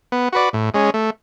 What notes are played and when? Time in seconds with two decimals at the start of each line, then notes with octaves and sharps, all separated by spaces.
0.12 B3
0.33 F#4 B4 D5
0.53 A2
0.74 G#3 C#4
0.94 A3